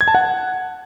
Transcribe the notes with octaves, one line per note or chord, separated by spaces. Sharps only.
G#6
A5
F#5